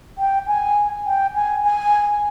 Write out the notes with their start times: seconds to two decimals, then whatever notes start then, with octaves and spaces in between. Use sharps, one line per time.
0.18 G5
0.47 G#5
1.06 G5
1.35 G#5
1.64 G#5